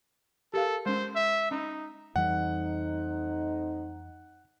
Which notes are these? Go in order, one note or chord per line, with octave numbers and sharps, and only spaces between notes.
G4 A4 A#4 F5
G#3 C#4 C5
E5
C#4 D#4
F2 E3 G3 A3 C4 D#4 F#5